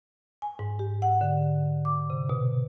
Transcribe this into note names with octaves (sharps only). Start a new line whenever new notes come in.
G#5
G#2
G4
F#5
D3
D6
C3
B2